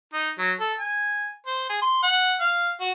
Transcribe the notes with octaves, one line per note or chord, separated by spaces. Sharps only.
D#4
F#3
A4
G#5
C5
G#4
C6
F#5
F5
F#4